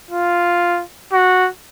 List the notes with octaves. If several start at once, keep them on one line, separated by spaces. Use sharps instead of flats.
F4
F#4